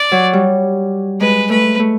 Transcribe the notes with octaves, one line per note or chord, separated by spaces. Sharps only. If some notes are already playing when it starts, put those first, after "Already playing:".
Already playing: D5
F#3
G3
G#3 B4
A3 B4
A3